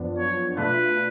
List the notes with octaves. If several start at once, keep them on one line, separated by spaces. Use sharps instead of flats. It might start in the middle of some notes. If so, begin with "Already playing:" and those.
Already playing: F#2 F3 B3 D4 F4
C#5
B2 A3 D4 F4 B4